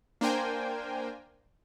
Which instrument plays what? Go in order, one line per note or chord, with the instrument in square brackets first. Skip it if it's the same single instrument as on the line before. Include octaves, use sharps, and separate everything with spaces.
[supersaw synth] A#3 D4 A#4 C5 G5 G#5